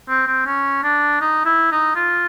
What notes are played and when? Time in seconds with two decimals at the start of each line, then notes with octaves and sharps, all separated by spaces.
0.09 C4
0.27 C4
0.46 C#4
0.83 D4
1.21 D#4
1.46 E4
1.72 D#4
1.96 F4